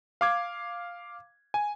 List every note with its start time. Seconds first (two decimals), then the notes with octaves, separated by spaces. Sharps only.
0.21 F5 D6 G#6
1.54 G#5